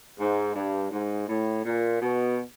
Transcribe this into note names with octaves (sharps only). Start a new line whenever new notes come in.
G#2
G2
G#2
A2
A#2
B2